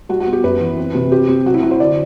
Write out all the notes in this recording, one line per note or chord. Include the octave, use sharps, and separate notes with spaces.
G3 F#4
F#4
B3
G4
F#2 B4
E3
C4
C3
C4 G4
C4
F#3 F#4
E4
F#3 F#4
C5
D3 D5